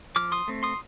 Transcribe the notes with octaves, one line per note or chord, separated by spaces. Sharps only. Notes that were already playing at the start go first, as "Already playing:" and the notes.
F3 D6 F6
C6 D#6
A3 C4
C6 D#6